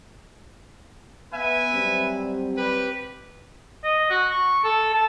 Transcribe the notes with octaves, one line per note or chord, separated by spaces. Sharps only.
B3 B4 E5 G#5
F#3 G3 C4
G4 B4
D#5
F#4
C#6
A4
A5